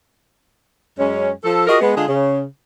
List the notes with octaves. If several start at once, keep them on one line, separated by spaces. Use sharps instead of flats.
F#2 G#3 C#4
F3 A4
F4 F#4 G#4 A#4 D#5
G#3 B3
D3 G#3 F4 G#4
C#3